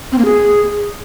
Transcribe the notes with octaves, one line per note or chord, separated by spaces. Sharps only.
C4
A#3
G#4